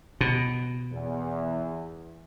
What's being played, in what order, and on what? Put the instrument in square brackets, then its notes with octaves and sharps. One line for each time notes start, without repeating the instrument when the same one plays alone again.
[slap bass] B2
[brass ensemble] E2